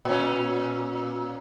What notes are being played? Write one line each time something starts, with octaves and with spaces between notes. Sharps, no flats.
A#2 C#4